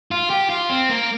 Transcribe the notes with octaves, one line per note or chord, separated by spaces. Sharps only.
F4
G4
F4
C4
A#3